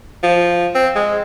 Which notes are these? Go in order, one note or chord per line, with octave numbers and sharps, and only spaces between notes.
F3
C4
G#3